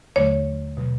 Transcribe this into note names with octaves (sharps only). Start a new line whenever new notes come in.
D#2 D3 F#3 A3 C#5
B2 F#3